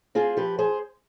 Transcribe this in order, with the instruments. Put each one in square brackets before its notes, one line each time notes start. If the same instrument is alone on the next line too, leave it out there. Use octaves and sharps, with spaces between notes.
[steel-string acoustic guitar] C4 F4 G#4
F3 G4 B4
G#4 C5